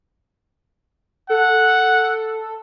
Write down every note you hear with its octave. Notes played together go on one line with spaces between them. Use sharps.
A4 F#5